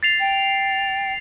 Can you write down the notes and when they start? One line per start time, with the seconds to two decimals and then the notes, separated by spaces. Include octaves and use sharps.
0.03 A6 C7 F7
0.20 G5